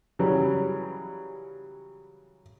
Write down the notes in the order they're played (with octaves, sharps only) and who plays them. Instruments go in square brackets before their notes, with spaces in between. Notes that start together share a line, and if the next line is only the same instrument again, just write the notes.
[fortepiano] C#3 E3 F#3 G3